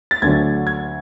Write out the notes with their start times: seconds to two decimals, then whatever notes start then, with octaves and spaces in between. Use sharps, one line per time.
0.11 A6
0.22 D2 D3 F#3 G#6
0.67 G#6